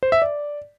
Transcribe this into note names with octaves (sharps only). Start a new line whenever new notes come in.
C5
E5
D5